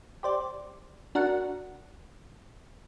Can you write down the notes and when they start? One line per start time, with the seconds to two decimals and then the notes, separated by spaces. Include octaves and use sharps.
0.23 G4 C5 D5
1.15 D4 F#4 A#4 F#5